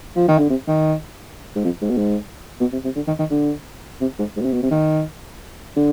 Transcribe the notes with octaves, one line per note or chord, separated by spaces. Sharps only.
F3
D#3
D3
C3
D#3
G#2
F2
G#2
B2
G#2
B2
C3
C3
D3
D#3
D#3
D3
C3
G#2
G#2
B2
C3
B2
C3
D#3
D3